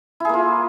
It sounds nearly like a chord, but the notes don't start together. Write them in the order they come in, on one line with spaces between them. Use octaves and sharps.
E4 G#4 A#3 F4